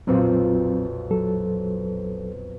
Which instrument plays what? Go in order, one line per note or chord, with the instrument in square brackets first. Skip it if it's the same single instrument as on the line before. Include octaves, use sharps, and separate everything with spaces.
[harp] B1 F2 A#2 [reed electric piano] F#3 C4
[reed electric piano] F#3 A4